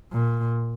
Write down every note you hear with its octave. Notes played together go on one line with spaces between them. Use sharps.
A#2